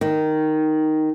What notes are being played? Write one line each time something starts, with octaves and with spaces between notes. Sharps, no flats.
D#3